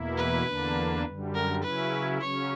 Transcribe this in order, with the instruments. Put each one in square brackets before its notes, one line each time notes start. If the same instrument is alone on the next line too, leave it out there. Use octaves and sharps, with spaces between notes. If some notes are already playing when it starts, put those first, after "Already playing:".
Already playing: [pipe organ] E2 B2 A#3 E4
[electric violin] B4
[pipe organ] E2 D3 A#3 D4
F#2 D3 G3
[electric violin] A#4
[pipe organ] C#3 F#3 C#4 E4 [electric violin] B4
[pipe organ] C#3 F#3 C#4 [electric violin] C#5